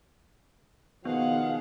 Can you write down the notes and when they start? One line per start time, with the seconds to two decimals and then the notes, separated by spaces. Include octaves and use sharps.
1.05 B2 D#3 F3 B3 G#4 F5 F#5